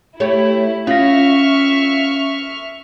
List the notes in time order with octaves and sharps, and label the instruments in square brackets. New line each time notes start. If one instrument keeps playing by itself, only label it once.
[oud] A3 G4 C#5 [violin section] E4
[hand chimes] C#4 F5 A#6 [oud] F4 [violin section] E5 C#6 F6